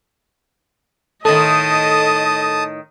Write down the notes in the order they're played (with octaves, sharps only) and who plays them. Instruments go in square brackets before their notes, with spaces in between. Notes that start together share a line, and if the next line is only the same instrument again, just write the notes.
[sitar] A2 D#3 [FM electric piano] A4 [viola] D#5 [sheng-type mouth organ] A5 D#6